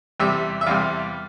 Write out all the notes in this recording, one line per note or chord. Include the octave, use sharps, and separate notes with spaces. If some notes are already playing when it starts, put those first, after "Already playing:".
E2 C3 G3 E5
E5
E2 C3 G3 F5